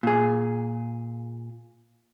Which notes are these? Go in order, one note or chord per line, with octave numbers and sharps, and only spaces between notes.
A#2 G#4